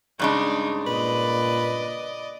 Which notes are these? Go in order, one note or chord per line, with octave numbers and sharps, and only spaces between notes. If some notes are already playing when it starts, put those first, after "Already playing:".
G2 C#3 G#3 D4 D#4
A#2 B4 D5 D#5